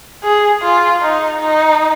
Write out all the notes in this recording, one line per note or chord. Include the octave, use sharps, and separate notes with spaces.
G#4
F4
D#4
D#4